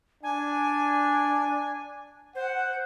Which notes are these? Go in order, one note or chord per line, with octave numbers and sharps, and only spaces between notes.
D4 G#5
C5 F#5